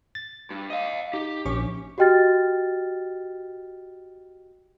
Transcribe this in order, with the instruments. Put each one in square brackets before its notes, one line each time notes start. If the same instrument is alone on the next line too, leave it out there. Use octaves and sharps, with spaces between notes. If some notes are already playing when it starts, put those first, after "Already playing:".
[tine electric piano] A6
[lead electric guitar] G2
D#5 F5
[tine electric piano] D#4 [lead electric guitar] G4
[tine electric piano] A#1 C#4 C#6
[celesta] F#4 G4 D#5 G5 F6 A6